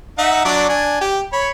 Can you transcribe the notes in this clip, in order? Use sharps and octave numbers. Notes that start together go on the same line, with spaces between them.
D#4 E5 F#5
F#3 D4 D5
D4 G#5
G4
C#5 B5